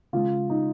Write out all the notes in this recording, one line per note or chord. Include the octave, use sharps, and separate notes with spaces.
C#3 F3 G#3 F4
D#4